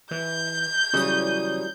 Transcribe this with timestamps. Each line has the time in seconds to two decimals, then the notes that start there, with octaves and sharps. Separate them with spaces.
0.11 E3 G6
0.93 C#3 E3 F#3 G3 D#6